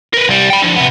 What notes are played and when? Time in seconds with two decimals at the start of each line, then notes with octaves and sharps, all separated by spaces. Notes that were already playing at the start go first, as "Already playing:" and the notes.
0.14 A#4 B4
0.28 C2 G3
0.50 G5 B5
0.62 D3 F3
0.76 C3 B3